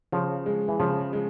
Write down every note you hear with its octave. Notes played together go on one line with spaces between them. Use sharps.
C#3 F3
G#3
E3
C#3 F3
G#3